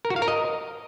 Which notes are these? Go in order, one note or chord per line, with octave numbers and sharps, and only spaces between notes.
A#4
F#4
F5
A#4
D#5